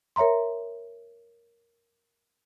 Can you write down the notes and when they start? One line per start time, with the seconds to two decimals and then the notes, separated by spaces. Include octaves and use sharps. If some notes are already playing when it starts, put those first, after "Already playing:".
0.16 A#4 C#5 E5 A#5 C6